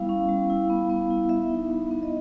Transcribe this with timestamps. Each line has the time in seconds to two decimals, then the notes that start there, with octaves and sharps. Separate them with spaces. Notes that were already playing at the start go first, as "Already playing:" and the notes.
Already playing: G3 B3 E4 F5
0.09 C#4
0.29 G3
0.50 E4
0.70 B3
0.89 B3
1.10 E4
1.29 B3 E5
1.49 D#4
1.70 B3
1.91 B3
2.03 D#5